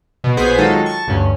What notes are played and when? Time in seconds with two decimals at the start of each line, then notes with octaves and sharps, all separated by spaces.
0.24 B2
0.37 A#1 B3 G#4 C5 G#6 B6
0.58 D#3 F#3 G#3 D#4 F4 A4
0.86 A5 C#6
1.07 D2 G2 C#4